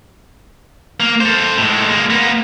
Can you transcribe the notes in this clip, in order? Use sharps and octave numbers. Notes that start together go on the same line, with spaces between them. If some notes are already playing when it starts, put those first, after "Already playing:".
A#3
A4 C5
A2 G#3
G#3 A#3
A#3 B3